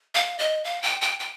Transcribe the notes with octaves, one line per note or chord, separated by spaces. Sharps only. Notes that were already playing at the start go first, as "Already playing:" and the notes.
F5
D#5
F5
G5
G5
G5